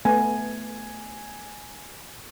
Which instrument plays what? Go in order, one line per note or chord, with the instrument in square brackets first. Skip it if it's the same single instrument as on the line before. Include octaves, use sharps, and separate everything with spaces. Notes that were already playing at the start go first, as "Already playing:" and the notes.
[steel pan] A3 B3 [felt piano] G#5